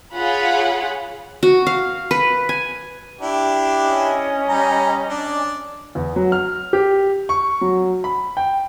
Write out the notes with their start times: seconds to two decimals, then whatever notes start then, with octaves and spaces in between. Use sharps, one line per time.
0.15 F4 G#4 C#5 F#5 B5
1.43 F#4
1.67 F5
2.11 B4
2.49 G#5
3.21 D4 E4 G4
3.87 C#4 D#5
4.49 G3 A#5
5.09 D4 D5
5.95 E2
6.16 F#3
6.32 F6
6.73 G4
7.29 C#6
7.61 F#3
8.04 B5
8.37 G5